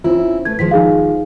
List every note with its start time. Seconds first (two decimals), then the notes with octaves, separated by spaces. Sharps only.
0.04 C4 C#4 E4 F4
0.45 A3 B4 G#6
0.59 D#3 F3 G#3 B6
0.71 D#4 G#4 F5